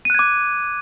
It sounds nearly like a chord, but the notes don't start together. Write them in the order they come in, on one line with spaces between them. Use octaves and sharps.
D#7 F#6 G#6 D6